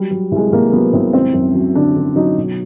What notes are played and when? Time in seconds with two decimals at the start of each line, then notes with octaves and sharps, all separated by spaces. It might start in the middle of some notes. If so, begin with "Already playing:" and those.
Already playing: F#3 G3
0.11 F#3
0.31 C2 G#3
0.52 C2 A#3
0.72 F#3 B3
0.93 C2 C4
1.13 G#1 C4
1.34 F#2
1.55 F#3
1.75 D3 D4
1.96 D3
2.16 F#3 D#4
2.37 B2